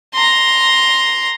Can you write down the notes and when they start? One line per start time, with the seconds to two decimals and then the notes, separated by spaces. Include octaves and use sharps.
0.14 A#5 C6